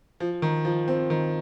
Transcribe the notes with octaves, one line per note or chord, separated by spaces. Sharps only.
F3
D#3
F3
C4
D#3